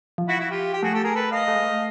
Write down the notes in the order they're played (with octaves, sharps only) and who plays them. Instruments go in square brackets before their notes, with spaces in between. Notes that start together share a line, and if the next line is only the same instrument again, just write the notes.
[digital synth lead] F3
[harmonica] E4 F#4
E4 F#4
F4 G4
G4
[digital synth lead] A3 [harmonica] F#4 G#4
[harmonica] G4 A4
G#4 A#4
A4 B4
D#5 F5
[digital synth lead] A3
G#3
A3